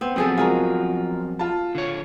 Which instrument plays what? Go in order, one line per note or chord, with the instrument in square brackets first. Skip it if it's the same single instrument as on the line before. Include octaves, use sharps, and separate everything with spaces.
[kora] B3 C4
[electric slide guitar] F3 F#3 C4 [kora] B3 G#4 A4
[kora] G#3 F#4 [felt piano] F4 A#4
[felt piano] F4 A5
[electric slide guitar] D3 C#5